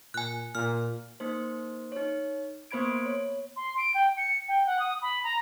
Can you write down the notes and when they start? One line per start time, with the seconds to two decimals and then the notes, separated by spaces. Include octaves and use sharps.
0.14 A#2 G#5 F#6
0.55 A#2 F6
1.20 A#3 D#4 C5
1.92 D#4 C#5
2.71 A#3 B3 C5 B5 G#6 D7
3.06 C#5
3.56 C6
3.78 D7
3.94 G5
4.17 C#7
4.48 G5
4.66 F#5
4.79 D#6
5.02 B5
5.23 A#5